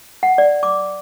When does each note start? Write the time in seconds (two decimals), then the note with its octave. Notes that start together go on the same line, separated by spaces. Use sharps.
0.23 F#5
0.38 D5
0.63 D6